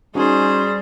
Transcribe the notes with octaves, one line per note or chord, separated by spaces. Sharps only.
G3 C#4 D#4 F#4 G#4 C5